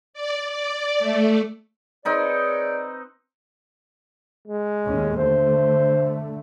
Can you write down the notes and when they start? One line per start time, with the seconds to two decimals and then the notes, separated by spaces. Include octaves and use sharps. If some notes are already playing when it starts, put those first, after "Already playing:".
0.14 D5
0.50 D5
0.99 A3
2.05 C4 D#4 G#4 B4 C#5 D5
4.48 G#3
4.86 D#2 A2 C#4
5.17 D3 A3 C5